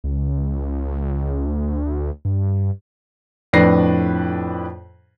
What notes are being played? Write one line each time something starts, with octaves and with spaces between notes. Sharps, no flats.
C#2
D2
G2
F2 A2 D4 B4 A#6 C7